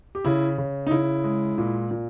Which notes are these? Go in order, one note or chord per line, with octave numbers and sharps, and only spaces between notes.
G4
C#3 E4
C#3
D#4
C#3 E4
G#3
A#2
A#2